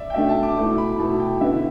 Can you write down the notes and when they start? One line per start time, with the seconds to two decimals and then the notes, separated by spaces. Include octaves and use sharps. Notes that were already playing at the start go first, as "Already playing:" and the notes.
Already playing: D5 E5
0.10 G5
0.14 B2 A3 D4 E5
0.29 A5
0.43 D6
0.57 B2 A3 E4 D6
0.78 B5
0.98 B2 A3 E4 A5
1.19 G5
1.41 D3 B3 E4 E5